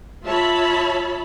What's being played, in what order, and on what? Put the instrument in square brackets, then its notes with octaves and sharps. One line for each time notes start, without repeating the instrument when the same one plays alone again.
[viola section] F4 C#5 E5 A5 B5